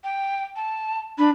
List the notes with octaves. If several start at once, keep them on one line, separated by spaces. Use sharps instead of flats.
G5
A5
D4 B5